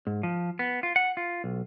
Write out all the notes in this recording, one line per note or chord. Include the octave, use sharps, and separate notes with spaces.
G#2
F3
B3
F4
F#5
F4
B1